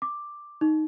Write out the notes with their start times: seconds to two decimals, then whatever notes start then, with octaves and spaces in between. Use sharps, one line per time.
0.02 D6
0.61 D#4